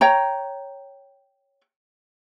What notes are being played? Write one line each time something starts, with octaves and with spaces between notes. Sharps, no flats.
C#5 G5 A#5